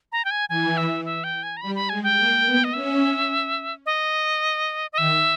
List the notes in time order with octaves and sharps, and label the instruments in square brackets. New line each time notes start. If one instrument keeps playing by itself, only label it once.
[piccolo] A#5
G5
G#5
[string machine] E3 [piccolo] G#5
[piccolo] E5
E5
G5
G#5
A#5
[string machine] G3 [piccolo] B5
[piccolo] B5
[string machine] G#3 [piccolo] G#5
[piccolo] G5
[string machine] A#3
B3
[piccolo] D#5
[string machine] C#4 [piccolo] E5
[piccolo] D#5
D#5
[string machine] D#3 [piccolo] E5